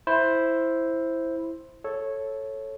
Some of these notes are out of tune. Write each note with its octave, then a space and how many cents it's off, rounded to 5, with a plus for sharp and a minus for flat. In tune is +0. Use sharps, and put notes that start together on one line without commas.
E4 +0 C5 +5
A4 -5 C#5 -10